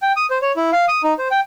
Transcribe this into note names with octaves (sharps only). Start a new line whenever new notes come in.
G5
D#6
C5
C#5
E4
F5
D#6
D#4
C5
G5